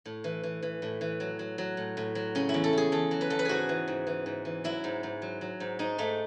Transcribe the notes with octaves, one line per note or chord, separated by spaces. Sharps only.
A2
E3
E3
E3
A2
E3
F#3
F#3
F#3
A2
A2
F#3
C#3 C#4
E4
E2
A4
E2 G#4
E2 A4
F#3
B4
E2 A4
B4
G#2 F#4 G#4
E3
G#2
E3
G#2
E3
F#3 E4
G#2
G#2
F#3
F#3
G#2
G#2 D#4
G#2 A3